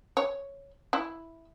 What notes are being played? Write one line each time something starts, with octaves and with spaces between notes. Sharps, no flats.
C#5
E4